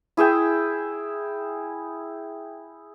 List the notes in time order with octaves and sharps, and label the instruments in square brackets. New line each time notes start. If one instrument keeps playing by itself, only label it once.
[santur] E4 G#4 E5 G5